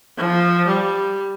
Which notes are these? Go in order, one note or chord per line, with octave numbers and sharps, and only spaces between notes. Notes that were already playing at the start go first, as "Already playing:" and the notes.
F3
G3